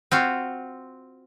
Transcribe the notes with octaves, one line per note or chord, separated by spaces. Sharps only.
C4 F4 F#4